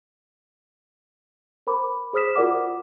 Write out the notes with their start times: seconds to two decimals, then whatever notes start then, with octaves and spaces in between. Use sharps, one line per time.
1.67 A#4 C5 B5 D6
2.13 G#4 C5 D#6 F6 B6 E7
2.36 F4 F#4 A#4 D5 F#5 D6